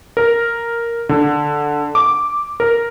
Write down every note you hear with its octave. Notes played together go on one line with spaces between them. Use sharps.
A#4
D3
D6
A#4